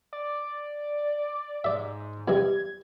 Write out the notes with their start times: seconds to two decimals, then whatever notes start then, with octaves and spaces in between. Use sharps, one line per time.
0.13 D5
1.64 G#2 D5 E5
2.28 E2 G2 C3 G#6